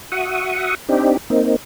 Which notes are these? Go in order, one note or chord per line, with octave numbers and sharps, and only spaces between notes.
F#4 E5 F#5 C#6 D#6
C4 D4 D#4 G4
A#3 C4 D#4